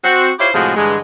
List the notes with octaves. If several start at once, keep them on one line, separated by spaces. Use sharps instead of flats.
C4 F#4
E4 F4 G4 C5 C#5 E5
A2 C3 F3 G#3 F#4 G#4
G2 D3 E3 G#3